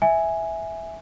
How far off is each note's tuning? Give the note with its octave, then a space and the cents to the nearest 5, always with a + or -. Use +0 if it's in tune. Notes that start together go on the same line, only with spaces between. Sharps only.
E5 -10 G#5 +0